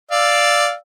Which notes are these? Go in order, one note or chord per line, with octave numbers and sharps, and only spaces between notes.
D5 F5 E6